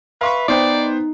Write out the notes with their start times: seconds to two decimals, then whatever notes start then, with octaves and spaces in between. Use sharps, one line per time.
0.21 B4 E5 F5 C6 C#6
0.48 B3 D#4 C5 D5 G5